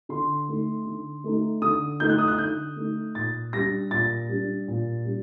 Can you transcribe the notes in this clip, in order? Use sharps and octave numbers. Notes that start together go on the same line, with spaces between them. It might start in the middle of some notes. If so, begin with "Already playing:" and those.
D3 C6
A3 D#4
D3
A3 D#4
D3 D#6
A3 D#4 G6
F#6
D#6
F#6
D3 G6
A3 D#4
A#2 A6
G3 D4 A#6
A#2 A6
G3 D4
A#2
G3 D4